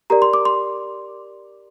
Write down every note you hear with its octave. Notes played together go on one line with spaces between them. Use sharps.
G4 A#4 D5 A#5
C6
D6
C6